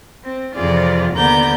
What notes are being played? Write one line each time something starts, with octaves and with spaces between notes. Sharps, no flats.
C4
F2 C3 E3 F4 G#4 D5
D#2 D3 B3 D5 A#5 G6